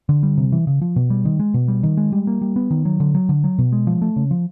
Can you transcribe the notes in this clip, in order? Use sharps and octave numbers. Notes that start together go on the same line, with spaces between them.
D3
G3
C3
E3
C#3
F3
B2
G3
D#3
G#3
B2
G3
D#3
G#3
G3
A#3
G3
B3
D#3
F#3
D3
F#3
D3
F#3
B2
G#3
F3
A3
C#3
F3